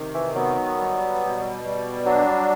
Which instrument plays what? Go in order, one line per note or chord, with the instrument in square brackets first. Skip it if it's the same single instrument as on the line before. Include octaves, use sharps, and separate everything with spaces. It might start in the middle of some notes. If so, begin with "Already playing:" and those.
Already playing: [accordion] C3 D#3
[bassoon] E3
[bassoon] F#3 [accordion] B3
[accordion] G3
B2
G3
[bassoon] F#3 [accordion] D4